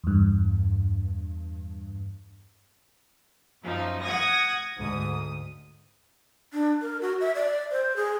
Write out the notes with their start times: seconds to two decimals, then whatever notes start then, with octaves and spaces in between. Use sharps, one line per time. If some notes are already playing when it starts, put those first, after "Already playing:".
0.04 E2 G2
3.62 F#2 F3 D#4
4.03 F#5 D#6 G#6 A#6
4.77 D2 G#2 D#6
6.53 D4
6.82 A#4
7.02 F#4
7.21 E5
7.35 D5
7.71 C5
7.96 G#4